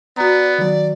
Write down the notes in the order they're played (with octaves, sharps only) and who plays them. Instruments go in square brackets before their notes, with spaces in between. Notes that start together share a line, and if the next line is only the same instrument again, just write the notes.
[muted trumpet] B3 [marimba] F#4 A#5 [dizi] D5
[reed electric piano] D#3 F#3 [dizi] D5